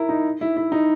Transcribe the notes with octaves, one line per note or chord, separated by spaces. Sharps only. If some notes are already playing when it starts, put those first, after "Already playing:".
Already playing: E4 A#4
D#4
E4
E4
D#4